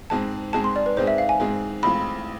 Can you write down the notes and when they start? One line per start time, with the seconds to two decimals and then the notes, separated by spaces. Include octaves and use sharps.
0.10 G#2 G#3 C4 G#4 A5
0.53 G#2 G#3 C4 G#4 A5
0.64 C6
0.76 D5
0.86 B4
0.97 G#2 G#3 C4 G#4 C5
1.07 E5
1.18 F5
1.29 G#5
1.40 G#2 G#3 C4 G#4
1.83 A1 A2 G#3 C4 F4 B5